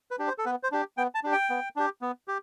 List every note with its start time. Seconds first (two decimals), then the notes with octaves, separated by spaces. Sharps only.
0.11 B4
0.19 D4 G4
0.28 C5
0.38 A4
0.45 B3 B4
0.63 C5
0.72 D4 G4
0.97 B3 G5
1.15 A5
1.23 D4 G4
1.32 G5
1.50 B3
1.76 D4 G4
2.02 B3
2.28 G4